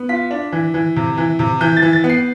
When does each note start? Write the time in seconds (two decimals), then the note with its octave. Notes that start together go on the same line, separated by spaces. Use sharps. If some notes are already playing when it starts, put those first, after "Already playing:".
Already playing: B3
0.09 F4 B6
0.31 D4
0.52 E3
0.74 E3
0.96 C3
1.18 E3
1.39 C3
1.61 E3 G6
1.77 A6
1.82 E3
1.93 A6
2.04 B3
2.10 C7